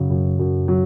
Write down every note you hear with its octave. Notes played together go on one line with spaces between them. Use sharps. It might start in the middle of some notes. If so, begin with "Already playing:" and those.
Already playing: F#2 C#3 F#3
F#2
F#2
F#3